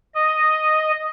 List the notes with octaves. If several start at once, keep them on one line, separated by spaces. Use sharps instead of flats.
D#5